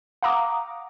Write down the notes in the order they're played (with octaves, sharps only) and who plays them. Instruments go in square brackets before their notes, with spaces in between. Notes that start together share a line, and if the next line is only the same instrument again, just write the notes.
[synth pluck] F5 F#5 A#5 D6 D#6